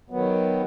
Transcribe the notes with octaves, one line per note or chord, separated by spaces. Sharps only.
D#3 F#3 B3